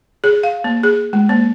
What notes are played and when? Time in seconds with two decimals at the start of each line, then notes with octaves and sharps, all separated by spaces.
0.24 G#4
0.43 F5
0.64 A#3
0.83 G#4
1.13 G#3
1.29 A#3